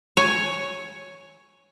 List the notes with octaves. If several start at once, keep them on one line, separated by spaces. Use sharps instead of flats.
C#5 G#5